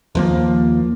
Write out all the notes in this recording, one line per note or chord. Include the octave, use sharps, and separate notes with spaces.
D#2 F3 A#3